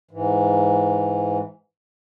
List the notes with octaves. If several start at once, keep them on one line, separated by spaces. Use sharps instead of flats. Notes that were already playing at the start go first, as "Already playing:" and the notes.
G#2 E3